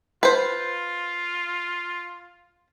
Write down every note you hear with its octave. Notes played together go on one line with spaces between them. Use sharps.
F4 B4 C5